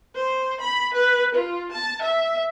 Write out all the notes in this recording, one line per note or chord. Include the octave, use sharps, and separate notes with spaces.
C5
B5
B4
F4
A5
E5